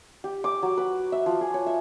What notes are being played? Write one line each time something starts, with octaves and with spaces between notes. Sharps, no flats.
G4
D6
F#3
B4
E5
F3
G#4
C#5
E5